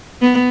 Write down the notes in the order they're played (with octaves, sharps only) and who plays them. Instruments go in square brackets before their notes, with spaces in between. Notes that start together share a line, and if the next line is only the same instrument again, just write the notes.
[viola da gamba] B3